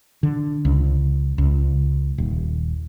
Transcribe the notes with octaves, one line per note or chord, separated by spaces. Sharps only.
D3
C#2
C#2
D#1